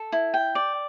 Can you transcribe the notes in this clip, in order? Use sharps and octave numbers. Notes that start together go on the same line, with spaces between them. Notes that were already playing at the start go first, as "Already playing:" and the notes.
Already playing: A4
E4
G5
D5